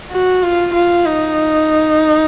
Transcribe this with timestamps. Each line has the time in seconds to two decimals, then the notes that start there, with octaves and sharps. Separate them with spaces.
0.12 F#4
0.43 F4
0.74 F4
1.05 D#4